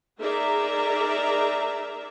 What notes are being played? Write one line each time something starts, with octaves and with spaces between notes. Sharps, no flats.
D#4 G#4 A#4 D5 E5 A#5